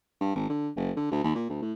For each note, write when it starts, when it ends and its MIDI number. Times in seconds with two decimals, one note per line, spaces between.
0.21 0.31 43
0.35 0.47 32
0.50 0.70 50
0.77 0.92 30
0.97 1.10 50
1.12 1.20 38
1.24 1.34 39
1.35 1.45 46
1.50 1.58 38
1.62 1.73 45